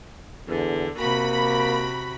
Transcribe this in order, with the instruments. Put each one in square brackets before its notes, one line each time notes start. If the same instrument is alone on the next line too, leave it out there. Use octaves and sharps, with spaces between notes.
[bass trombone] E2 [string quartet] D3
[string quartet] C3 F#4 [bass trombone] A#3 [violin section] B5